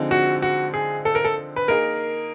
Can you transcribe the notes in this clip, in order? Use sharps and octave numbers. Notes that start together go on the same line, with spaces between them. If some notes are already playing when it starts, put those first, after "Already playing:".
Already playing: D3 F3 G#3 C4 D#4
F#4
F#4
G#4
A4
A#4
A4
B4
A#3 D#4 G#4 A#4